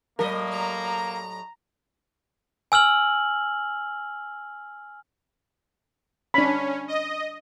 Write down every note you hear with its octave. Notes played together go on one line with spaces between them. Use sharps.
A2 F#3 A#3 A#4 D#5
A#5
G#5 E6 F6 F#7
C#4 D4 B5
D#5